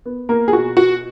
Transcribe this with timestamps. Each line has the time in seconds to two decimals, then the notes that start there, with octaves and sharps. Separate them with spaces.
0.06 B3
0.29 A#3 A#4
0.48 G#4
0.53 B2 F#4
0.77 F#4